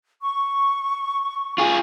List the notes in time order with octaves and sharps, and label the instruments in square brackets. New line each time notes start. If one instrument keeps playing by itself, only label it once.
[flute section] C#6
[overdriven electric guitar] F4 G#4